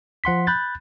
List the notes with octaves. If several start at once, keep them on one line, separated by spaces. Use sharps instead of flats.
F3 F#5 C6 B6
B5 F#6 G6 A6